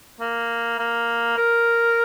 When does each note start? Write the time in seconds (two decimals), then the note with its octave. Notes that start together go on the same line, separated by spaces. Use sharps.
0.20 A#3
0.79 A#3
1.37 A#4